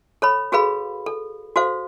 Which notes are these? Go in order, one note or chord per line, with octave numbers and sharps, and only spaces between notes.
A4 C#5 B5
F#4 G#4 A4 B4 F5 B5
A4
F#4 A4 C5 F5